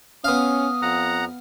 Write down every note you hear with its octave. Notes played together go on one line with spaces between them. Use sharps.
B3 C#4 F5 D#6
F2 F#5 A#5